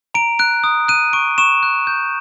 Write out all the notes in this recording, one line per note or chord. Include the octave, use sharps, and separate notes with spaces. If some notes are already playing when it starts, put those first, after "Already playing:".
A#5 D7
F#6 D7
D#6
F#6 D#7
C#6 D7
C#6 E7
F#6
G6